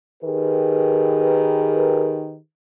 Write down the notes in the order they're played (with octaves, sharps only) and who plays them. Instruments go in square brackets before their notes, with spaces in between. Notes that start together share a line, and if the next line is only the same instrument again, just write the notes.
[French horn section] D#3 G4 G#4 A#4 B4